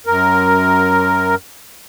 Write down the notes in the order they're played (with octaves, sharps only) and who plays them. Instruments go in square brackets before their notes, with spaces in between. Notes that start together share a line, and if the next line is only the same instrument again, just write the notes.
[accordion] F#2 A#4